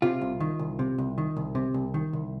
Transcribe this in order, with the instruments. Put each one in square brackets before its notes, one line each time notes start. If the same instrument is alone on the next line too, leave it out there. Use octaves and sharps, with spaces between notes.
[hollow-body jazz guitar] C3 F4
C2
D#3
C2
C3
C2
D#3
C2
C3
C2
D#3
C2